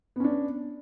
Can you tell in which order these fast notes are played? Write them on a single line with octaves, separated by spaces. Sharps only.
B3 C#4 D4